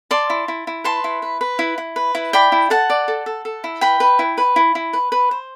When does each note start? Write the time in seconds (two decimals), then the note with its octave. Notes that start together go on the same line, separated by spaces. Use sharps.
0.11 D5 A5 C6
0.30 E4
0.48 E4
0.67 E4
0.84 B4 A5 C6
1.04 E4
1.22 B4
1.41 B4
1.59 E4
1.78 E4
1.96 B4
2.15 E4
2.33 D5 G5 B5
2.52 E4
2.70 A4 F#5 A5
2.90 D5
3.08 A4
3.26 A4
3.45 A4
3.64 E4
3.81 B4 G5 B5
4.00 B4
4.19 E4
4.38 B4
4.56 E4
4.75 E4
4.93 B4
5.12 B4
5.31 C5